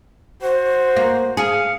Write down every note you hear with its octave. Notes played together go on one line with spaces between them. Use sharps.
F#4 C5
A#3
G#4 F5 C#7